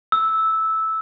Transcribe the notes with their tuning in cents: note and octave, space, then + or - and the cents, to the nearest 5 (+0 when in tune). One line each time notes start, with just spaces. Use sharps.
E6 -10